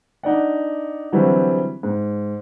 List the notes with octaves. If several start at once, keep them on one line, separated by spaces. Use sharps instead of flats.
D4 D#4 D5 F#5
D3 E3 F#3 G3 C4
G#2